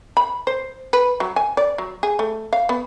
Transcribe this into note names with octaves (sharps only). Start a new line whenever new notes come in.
B5
C5
B4
F#3
G#5
D5
F#3
G#4
A3
F5
B3